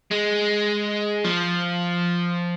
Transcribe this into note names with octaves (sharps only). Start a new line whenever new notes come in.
G#3
F3